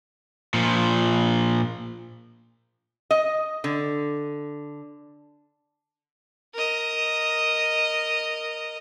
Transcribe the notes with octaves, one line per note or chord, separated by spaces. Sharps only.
A#2 F3
D#5
D3
A#4 D#5